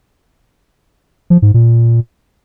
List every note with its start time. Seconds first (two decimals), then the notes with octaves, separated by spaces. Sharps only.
1.30 F3
1.42 G#2
1.54 A#2